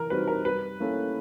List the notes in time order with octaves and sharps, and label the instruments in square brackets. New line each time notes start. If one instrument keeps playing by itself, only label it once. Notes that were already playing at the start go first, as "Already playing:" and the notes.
Already playing: [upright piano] E3 [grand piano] A#4
[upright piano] G3 C4 D#4 F#4 [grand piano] B4
[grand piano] A#4
[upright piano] G3 [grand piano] B4
[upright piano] A#3 C#4 E4 A4